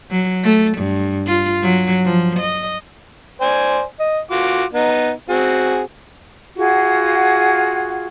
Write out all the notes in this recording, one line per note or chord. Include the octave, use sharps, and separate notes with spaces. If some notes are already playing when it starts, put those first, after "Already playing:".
F#3
A3
G2
F4
F#3
F3
D#5
C5 D5 G#5
D#5
F4 F#4 D6
B3 D#4
C4 F#4 G#4
F4 F#4 G#4 F#5